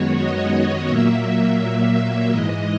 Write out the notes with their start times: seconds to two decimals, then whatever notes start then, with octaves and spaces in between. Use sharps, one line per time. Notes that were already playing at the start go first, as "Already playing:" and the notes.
Already playing: F#2 D#3 G#3 B3 F#4 C#5
0.17 D#5
0.88 A#2 F#3 A#3 E5
2.30 G#2 E3 G#3 D#5